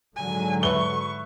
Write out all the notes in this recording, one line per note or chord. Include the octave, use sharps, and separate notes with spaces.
G#2 D3 F#3 G#5
B4 E5 C#6 G7